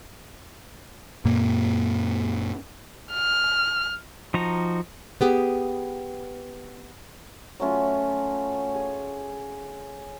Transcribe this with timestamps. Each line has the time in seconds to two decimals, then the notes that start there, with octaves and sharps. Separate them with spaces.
1.25 F#2 A#2 A#3
3.13 F6
4.34 F3 D#4 F#4 A#5
5.21 B3 G4 G#4
7.60 F#3 A3 C#4 F4
8.74 G#4